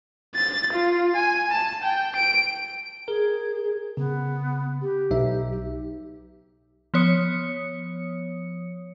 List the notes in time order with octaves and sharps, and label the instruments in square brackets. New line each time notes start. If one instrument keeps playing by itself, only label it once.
[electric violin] A6
F4
G#5
A5
G5
D7
[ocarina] G#4 [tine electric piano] A#4
[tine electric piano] C#3 [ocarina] B3
[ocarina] G4
[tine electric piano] B1 D#4 E5
[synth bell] F3 B3 C#5 D#6 C#7